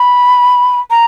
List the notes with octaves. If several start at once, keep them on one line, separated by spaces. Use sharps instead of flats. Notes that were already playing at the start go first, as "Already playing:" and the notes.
Already playing: B5
A#5